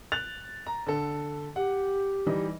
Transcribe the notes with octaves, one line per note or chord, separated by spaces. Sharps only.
F#6 A6 F7
A#5
D3 A4
G4 F#5
E3 G3 D#4